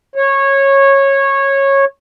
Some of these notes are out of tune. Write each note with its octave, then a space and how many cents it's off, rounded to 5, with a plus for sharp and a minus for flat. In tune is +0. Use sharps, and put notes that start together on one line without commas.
C#5 -15